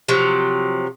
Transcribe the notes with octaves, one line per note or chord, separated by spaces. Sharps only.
C3 F3 F#3